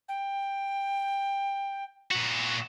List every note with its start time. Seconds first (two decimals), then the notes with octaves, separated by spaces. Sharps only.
0.08 G5
2.11 A#2 F#4